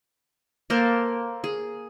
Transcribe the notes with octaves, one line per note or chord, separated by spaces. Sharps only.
A#3 A4 A#4 C5
G#4